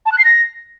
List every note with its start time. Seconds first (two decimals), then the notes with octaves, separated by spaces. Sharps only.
0.06 A5
0.12 F#6
0.18 C7
0.24 A#6